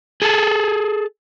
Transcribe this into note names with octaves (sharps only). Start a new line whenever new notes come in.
G#4 A4